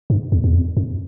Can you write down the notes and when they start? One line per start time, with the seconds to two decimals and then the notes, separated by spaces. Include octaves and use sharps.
0.10 G2
0.32 E2
0.44 E2
0.55 F2
0.77 F2